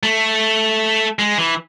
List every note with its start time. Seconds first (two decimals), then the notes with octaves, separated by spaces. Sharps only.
0.03 A3
1.19 G#3
1.38 E3